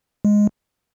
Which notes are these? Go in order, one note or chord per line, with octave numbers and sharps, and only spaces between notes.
G#3